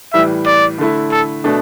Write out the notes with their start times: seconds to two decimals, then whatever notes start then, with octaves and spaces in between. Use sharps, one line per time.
0.13 A2 E3 G3 E5
0.46 D5
0.78 D3 A3 E4
1.11 A4
1.44 B2 A3 D4